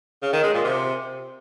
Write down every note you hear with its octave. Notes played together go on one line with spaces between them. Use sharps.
C#3
D#3
G#3
A#2
C3